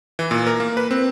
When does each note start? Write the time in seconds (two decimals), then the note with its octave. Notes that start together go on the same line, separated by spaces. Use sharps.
0.19 E3
0.31 A#2
0.47 A#4
0.60 A#3
0.77 B4
0.91 C4